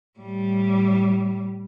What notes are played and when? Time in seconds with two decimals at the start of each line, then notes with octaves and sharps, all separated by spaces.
0.19 A2 G3